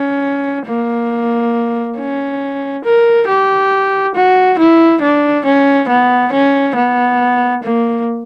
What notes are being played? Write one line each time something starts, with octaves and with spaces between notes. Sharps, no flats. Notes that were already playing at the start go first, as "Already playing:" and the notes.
Already playing: C#4
A#3
C#4
A#4
G4
F#4
E4
D4
C#4
B3
C#4
B3
A#3